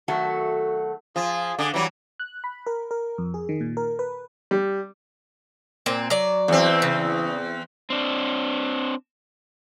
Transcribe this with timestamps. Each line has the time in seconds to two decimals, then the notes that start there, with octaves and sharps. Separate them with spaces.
0.08 D#3 F#3 A3 F#4 A4
1.16 F3 F4 G#4
1.59 D3 G#4 D6
1.74 E3 F#3 G3 D6
2.20 F#6
2.44 B5
2.66 A#4
2.91 A#4
3.18 F2
3.34 G#4
3.49 D#3
3.61 A#2
3.77 A#4
3.99 B4
4.51 G3
5.86 A#2 C4
6.10 F#3 D5
6.48 E2 C4
6.82 C#3
7.90 C4 D4